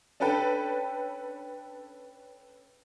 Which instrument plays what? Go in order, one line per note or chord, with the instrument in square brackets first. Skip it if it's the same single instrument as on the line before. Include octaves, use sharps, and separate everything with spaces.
[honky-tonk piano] C#4 D4 A4 B4 G5 A5